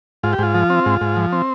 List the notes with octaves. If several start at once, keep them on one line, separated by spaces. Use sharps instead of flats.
G#2 F4
G4
G#2 F4
F3
C4
G#2
G#2
F3
C4